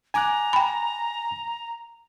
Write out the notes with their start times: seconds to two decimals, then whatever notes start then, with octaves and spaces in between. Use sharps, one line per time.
0.14 G#5 A#5 D6 F#6
0.53 G5 B5